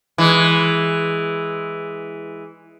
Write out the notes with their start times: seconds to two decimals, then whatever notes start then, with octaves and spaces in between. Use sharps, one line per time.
0.18 E3 G#3